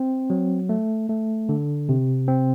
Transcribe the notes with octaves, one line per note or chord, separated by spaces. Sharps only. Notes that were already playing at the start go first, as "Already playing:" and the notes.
Already playing: C4
F#3
A3
A3
D3
C3
C4